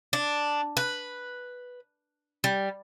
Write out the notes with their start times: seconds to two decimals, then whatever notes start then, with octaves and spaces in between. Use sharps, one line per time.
0.13 D4
0.77 B4
2.44 G3